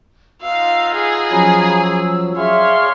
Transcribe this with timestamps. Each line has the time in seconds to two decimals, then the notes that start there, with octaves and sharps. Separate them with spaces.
0.42 B3 D#4 F4 F5 E6
0.95 G#4
1.31 F3 F#3 C#4 G#5 A#5 B5
1.81 E6
2.37 G#4 C#5 D5 E5 F5 C6 F6